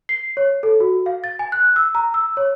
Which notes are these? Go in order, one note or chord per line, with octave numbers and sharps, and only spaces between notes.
C7
C#5
A4
F#4
F5
A6
G#5
F#6
E6
A#5
E6
C#5